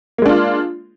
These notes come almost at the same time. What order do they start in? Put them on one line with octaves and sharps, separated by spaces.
A#3 G#3 D4 F4